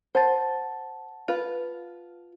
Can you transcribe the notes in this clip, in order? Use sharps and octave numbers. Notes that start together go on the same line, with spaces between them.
C5 F#5 A5 A6
F4 B4